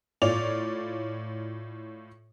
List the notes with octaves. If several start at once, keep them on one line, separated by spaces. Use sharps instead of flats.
A2 F4 C#5 D5 F7